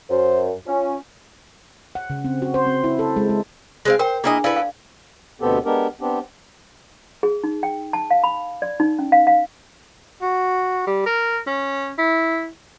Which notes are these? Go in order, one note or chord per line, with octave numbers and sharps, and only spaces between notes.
F#2 C5
C#4 F4
F#5
C#3
C4
F#4
C5
C4
E4
A4
G#3
G#3
G#3 C4 F5
A#4 C5 G5
A#3 D4 E4 G#4 D#5
E4 A4 B4 D5 F5
F5
D2 B2 B3 C4 G4 A4
G#3 B3 D4 G4 A#4
B3 C4 D4 G4
G#4
D#4
G5
A5
F5
B5
D5
D#4
C#4
F5
F5
F#4
G3
A#4
C#4
E4